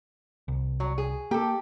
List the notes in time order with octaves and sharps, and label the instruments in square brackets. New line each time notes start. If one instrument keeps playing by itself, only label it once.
[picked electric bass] C2
[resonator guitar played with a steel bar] F#3
G#4
[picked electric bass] A#3 [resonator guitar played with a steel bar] G4 A4